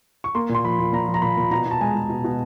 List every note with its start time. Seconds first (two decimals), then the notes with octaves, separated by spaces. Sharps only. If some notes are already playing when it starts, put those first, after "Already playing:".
0.24 C#6
0.35 A#3 C6
0.49 A#2
0.55 C6
0.64 F3 B5
0.79 A#2
0.93 A#2 A#5
1.08 F3
1.14 A#5
1.22 A#2 B5
1.37 A#2
1.51 B2 A#5
1.66 B2
1.71 A5
1.81 G#3 G#5
1.95 G#3
2.09 B2
2.24 B2